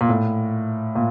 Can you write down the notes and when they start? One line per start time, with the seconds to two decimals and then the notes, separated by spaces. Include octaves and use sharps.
0.01 A#2
0.09 A2
0.95 A#2